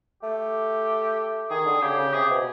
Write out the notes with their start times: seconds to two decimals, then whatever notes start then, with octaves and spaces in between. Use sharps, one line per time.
0.23 A3 G4
1.50 D#3 G#4
1.66 D3
1.82 C#3 G4
1.98 C#3
2.14 C3 G#4
2.30 B2